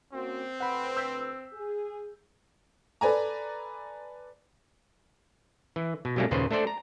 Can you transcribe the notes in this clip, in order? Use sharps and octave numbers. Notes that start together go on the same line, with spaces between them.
A#3 C4 C#4 F#4
D2 B4 F#5 B5
E6 G6 B6
G#4
A4 B4 D5 G#5 A#5
E3
B2
B2 F#3 G3 A3 A#3 C#4
D#2 A#2 C#3 B4 C5
A3 D4 A4 C5 D5
A#5